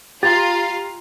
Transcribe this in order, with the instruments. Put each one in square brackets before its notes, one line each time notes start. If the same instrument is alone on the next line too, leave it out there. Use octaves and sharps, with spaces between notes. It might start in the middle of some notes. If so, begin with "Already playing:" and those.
[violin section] F4 F5 [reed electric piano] G4 [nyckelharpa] A#5 [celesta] A6